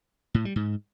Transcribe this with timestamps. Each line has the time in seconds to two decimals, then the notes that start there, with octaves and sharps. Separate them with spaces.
0.34 A2
0.45 G3
0.56 G#2